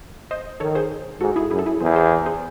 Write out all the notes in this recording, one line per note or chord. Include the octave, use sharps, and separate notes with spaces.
C5 D#5
D#3 A4 C#5
G#4 C5
G#2 F#4 A4
E4 G#4
F#2 E4 G#4
A4
E4 G#4
E2 G#4 C5
G#4 C5
G#4 C5